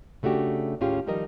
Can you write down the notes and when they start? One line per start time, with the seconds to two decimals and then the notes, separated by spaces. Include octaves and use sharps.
0.23 C#3 A3 D4 F#4 G4
0.80 D#2 A2 C#4 F4 G4 G#4
1.07 D#3 F3 G3 D#4 A#4 D#5